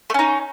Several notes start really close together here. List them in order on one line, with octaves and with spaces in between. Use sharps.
A3 C#4 D#4